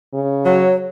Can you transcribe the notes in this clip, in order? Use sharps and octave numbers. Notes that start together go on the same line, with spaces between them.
C#3
F#3 C#5